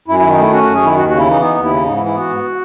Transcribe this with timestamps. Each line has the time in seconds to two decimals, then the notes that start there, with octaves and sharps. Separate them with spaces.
0.08 F#2 E4
0.19 D#3 E4
0.31 D#4
0.38 A3 E4
0.52 C#4 F#4
0.63 F#2 F#4
0.75 G#4
0.82 D#3 E4
0.97 D#2 F#4
1.08 C#3 F#4
1.18 E4
1.26 E3 D#4
1.40 B3 D#4
1.55 D#2
1.63 E4
1.70 C#3
1.84 G#2 D#4
1.96 E4
2.00 E3
2.06 E4
2.14 B3 F#4
2.29 G#2